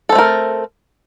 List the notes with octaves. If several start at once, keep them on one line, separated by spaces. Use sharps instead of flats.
A3 C4 A4 A#4